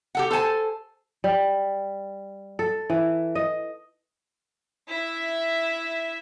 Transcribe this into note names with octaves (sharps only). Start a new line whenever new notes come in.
G4 A4 F#5
A4 C5 G#5 A5
G3
A4
E3
D#5
E4 E5